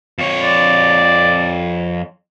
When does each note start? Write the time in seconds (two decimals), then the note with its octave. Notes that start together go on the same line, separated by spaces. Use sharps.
0.18 F2 C#5
0.43 D5